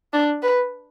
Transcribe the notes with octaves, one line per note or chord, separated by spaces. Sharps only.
D4
B4